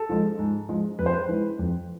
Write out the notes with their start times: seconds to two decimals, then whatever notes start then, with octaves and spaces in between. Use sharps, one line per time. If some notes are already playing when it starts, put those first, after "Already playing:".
Already playing: A4
0.09 F3 G#3
0.39 G#2
0.69 F3 G#3
0.99 F2 B4
1.06 C5
1.13 B4
1.29 E3 G#3
1.59 F2